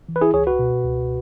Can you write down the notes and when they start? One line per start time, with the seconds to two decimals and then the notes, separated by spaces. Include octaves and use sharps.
0.09 E3
0.16 B4
0.21 E4 G#4
0.34 C#2 G#4 C#5
0.47 F#4 B4
0.59 B2
0.84 C#2